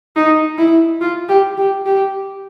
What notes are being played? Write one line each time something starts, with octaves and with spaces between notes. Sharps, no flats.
D#4
E4
F4
G4
G4
G4